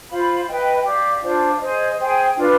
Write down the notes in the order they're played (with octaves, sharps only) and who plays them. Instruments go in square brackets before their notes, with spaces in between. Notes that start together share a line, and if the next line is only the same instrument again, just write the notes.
[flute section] F4 C5 F5 B5
B4 D#5 G5
G4 D5 F5
D4 F4 C5
G#4 C5 D#5
G#4 C5 G5
D4 F4 B4